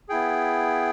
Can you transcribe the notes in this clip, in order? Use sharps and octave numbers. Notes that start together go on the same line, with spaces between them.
B3 E4 G#4 G5